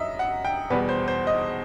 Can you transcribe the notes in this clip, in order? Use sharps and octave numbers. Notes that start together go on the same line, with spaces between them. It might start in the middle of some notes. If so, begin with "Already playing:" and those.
Already playing: F#2 F#3 D#5 E5
F#5
G5
E2 B2 G3 B4
C5
C5
D#5